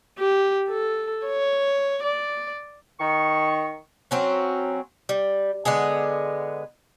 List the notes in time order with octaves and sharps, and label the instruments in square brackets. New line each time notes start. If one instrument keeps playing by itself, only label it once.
[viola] G4
A4
C#5
D5
[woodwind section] D#3 C#6
[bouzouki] F#3 C4 C#4
G3
D3 G#3 B3 G#4